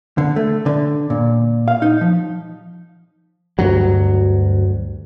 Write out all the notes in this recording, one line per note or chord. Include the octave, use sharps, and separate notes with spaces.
D3
A3
D3
A#2
F5
D#4
F3
D2 G2 F#3